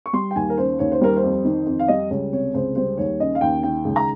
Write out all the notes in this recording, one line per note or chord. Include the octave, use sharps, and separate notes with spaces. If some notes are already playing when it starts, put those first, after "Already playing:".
C#6
G3 C6
G5
D#2 G#5
A#4
C#3 C5
D#2 C#5
C5
G3 A#4
C5
F2
D#3
F2
F5
G3 D#5
C#2 C#5
C3 C#5
C#2 C5
G3 C5
D#2 C#5
C#3 D#5
F5
D#2 G5
D#3 G5
C#2
A#5